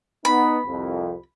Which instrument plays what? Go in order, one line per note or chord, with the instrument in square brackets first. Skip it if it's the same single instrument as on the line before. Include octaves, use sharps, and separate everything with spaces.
[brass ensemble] B3 D#4 [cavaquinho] B5
[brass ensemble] C2 F2